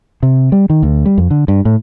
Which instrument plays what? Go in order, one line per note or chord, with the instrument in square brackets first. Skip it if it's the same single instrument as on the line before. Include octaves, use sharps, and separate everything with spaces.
[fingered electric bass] C3
G3
D#3
D2
G3
F2
D3
G2
A2